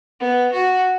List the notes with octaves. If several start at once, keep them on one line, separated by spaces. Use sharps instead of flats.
B3
F#4